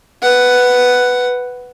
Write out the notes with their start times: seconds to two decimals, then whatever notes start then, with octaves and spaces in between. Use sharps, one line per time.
0.23 B4 F#5